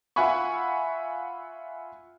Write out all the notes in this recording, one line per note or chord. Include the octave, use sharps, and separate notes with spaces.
F4 E5 F#5 G#5 B5 C#6